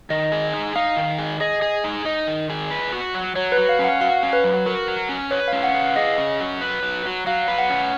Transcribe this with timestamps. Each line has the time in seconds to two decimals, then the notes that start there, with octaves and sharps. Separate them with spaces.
0.10 D#3 D#5
0.32 G#4
0.54 D#4
0.76 D#4 F5
0.97 D#3
1.18 G#4
1.40 G#4 D#5
1.62 G#4
1.84 D#4
2.05 D#4 D#5
2.27 D#3
2.50 G#4
2.71 B4
2.92 F#4
3.14 F#3
3.35 F#3 C#5
3.52 B4
3.58 F#4
3.69 F5
3.79 C#4
3.84 F#5
4.01 F#4 F5
4.23 C#4
4.33 B4
4.44 F#3
4.66 F#4 A#4
4.88 F#3
5.09 C#4
5.31 B4 C#5
5.48 F5
5.53 C#4
5.63 F#5
5.74 B4
5.80 F5
5.96 G#4 D#5
6.18 C#4
6.40 F#3
6.61 B4
6.83 F#3
7.05 F#3
7.27 F#3 F5
7.48 B4
7.58 F#5
7.70 C#4